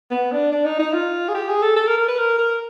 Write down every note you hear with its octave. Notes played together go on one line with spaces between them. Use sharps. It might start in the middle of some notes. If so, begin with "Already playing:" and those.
B3
D4
D4
D#4
D#4
F4
G#4
G4
G#4
A4
A4
A#4
A#4
B4
A#4
A#4